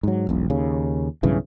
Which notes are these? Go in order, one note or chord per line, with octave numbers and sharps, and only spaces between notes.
G#2 F#3
E1 B1
D#2 C#3
B1 G2 C#3 E3